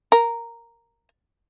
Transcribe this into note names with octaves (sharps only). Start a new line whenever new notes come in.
A#4